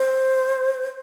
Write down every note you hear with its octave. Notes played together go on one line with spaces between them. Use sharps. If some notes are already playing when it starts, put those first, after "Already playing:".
Already playing: C5